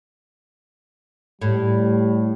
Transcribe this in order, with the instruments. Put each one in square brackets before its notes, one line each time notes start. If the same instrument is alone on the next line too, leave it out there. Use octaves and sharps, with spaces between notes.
[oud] A2 [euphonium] G3